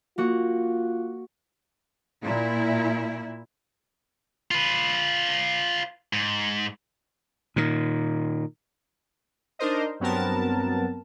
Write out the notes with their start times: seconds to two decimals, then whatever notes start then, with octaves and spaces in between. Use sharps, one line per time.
0.18 A#3 F4 F#4
2.23 A#2 E4
4.51 F4 B4
6.13 G#2
7.56 A#2 D#3
9.59 D4 D#4 A#4 C5 D#5
10.00 G2 F#3 B3 C4 A#4 A5